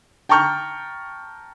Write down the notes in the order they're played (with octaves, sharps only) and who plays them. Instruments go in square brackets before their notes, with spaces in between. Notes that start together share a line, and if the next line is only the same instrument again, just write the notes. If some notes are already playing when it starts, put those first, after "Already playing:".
[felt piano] G5 A5 A#5 C#6 F6 G6